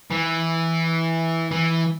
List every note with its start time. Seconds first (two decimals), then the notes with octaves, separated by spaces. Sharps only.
0.11 E3
1.51 E3